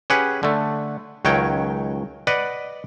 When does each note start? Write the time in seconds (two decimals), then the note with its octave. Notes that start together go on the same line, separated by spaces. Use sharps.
0.10 C#4 G4 G#4 B4 F#5
0.43 D3 A3
1.25 C#2 D#3 F#3 C#5 G5
2.27 B4 D5 D#5 F#5